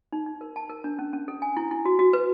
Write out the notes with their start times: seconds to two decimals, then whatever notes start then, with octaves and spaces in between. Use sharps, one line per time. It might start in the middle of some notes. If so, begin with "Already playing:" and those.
0.12 D#4
0.26 D#4
0.41 A#4
0.56 A5
0.70 A#4
0.84 D4
0.99 C#4
1.13 C#4
1.28 A4
1.42 G#5
1.57 E4
1.71 E4
1.85 F#4
1.99 F#4
2.13 B4